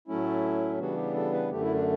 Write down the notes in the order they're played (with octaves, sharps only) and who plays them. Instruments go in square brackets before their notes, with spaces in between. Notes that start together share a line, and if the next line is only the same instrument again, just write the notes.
[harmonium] A2 F#3 A3 C#4 E4
C#3 E3 G3 B3 D4 F#4
G4
A4
B4
F#2 D3 A3 G4
E4
D4